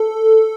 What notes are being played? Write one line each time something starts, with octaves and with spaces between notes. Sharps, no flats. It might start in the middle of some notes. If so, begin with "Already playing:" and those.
Already playing: A4